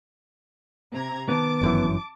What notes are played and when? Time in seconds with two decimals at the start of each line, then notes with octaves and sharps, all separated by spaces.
0.93 C3 A#5 G#6
1.29 D#3 B3 A5 D6
1.61 G1 F#2 E3